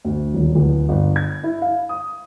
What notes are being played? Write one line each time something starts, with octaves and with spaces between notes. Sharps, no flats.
D2
D#1
D1
G1
G#6
E4
F5
D#6